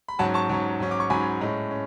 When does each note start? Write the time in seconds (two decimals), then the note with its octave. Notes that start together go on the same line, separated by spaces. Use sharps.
0.08 B5
0.19 G#2 F#3 C#4 F#5 A5
0.34 A5 C#6
0.49 G#2 F#3 C#4
0.80 G#2 F#3 C#4
0.91 D6
1.00 C#6
1.10 G#2 F#3 C#4 G#5 B5
1.41 A2 G#3 C#4
1.71 C#4